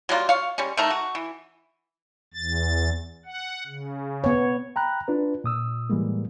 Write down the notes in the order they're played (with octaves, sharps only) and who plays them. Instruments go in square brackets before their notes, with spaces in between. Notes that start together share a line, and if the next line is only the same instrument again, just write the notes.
[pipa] F#3 G3 A#3 F4
C#5 F5
G3 G#3 C#4
D#3 A3 A#5
F#4
E3
[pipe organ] E2 A6
F#5
C#3
[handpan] B3 C#5
[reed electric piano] G5 A#5 B5 F#6
D4 F4 B4
A#2 D#6 E6
A2 E3 G3 G#3 A#3